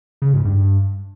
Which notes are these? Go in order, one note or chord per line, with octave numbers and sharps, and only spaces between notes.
C#3
G#2
G2